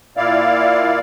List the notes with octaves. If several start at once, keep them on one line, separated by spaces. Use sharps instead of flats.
A#2 E4 D5 F5